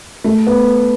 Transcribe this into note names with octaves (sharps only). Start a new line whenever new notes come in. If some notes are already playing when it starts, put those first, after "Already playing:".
A3
B3